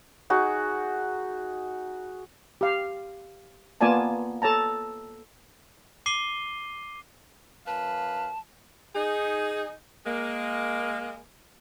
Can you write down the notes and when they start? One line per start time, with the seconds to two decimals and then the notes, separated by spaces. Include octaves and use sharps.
0.30 D#4 F#4 G#4
2.61 G4 F5
3.81 A#3 B3 F4 D5 G#5 A5
4.42 A4 C#5 A5 A#5
6.06 D6 C7 D#7 G7
7.66 F#2 B4 F5 A5
8.96 D#4 G#4
10.06 G#3 A#3